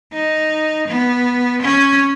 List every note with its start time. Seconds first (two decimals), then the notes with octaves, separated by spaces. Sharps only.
0.13 D#4
0.88 B3
1.62 C#4